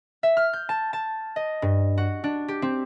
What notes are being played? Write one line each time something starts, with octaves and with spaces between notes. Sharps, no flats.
E5
F6
G6
A5
A5
D#5
G2
F#4
D4
G4
C4